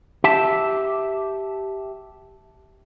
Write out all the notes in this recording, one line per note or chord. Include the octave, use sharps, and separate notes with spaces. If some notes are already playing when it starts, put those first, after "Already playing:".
G4 E5 A5